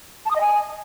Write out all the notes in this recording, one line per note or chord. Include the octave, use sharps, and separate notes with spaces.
A5
D#6
D#5
G#5